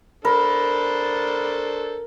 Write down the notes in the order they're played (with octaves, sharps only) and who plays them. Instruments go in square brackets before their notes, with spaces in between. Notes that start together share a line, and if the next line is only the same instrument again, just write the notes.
[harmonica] D4 A4 C5 [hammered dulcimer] A#4 [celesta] B5